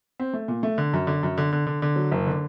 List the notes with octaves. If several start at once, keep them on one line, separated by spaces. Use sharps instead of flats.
C4
A3
A#2
A3
D3
F#2
D3
F#2
D3
D3
D3
D3
F#3
F#1
D3